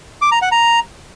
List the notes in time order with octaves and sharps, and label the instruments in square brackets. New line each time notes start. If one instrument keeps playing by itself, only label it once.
[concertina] D6
A#5
F#5
A#5